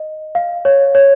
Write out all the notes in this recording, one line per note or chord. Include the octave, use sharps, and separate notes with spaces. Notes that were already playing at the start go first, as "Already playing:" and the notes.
Already playing: D#5
F5
C#5
C#5